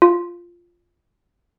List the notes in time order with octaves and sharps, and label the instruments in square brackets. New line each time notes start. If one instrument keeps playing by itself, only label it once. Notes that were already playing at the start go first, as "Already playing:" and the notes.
[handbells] F4